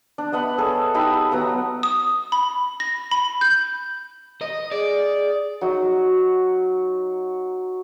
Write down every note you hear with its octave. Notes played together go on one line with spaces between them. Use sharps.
D4
B3 D#5 F#5 B5
G#4 A4 C#5
D#4 G4 B5 E6
F#3 B3 F#5 A5
D#6
B5
A#6
B5
G6
D#5
G#4 D5
F#3 D#4 D#6